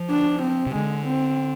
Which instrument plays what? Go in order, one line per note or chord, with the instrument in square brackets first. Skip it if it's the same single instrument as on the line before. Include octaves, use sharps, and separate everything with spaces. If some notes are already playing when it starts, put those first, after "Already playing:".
Already playing: [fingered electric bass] F3
[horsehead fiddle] D4
C4
[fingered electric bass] C3
[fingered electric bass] D3 [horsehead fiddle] G#3
[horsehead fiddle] C4